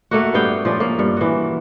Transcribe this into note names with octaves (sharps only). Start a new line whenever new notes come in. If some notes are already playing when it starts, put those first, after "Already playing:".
A3 A#3 F#4
G2 B3 F5 G5
F3 C#4 D5
A#3
G2
E3 F#4